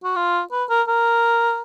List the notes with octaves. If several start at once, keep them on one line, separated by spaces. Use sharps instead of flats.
F#4
F4
B4
A#4
A#4